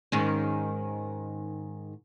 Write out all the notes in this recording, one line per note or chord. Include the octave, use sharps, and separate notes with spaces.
G#2 D#3 C#4